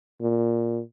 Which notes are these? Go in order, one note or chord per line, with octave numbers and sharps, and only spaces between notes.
A#2